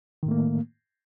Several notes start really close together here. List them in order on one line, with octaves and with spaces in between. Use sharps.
D#3 A2 A3 A#3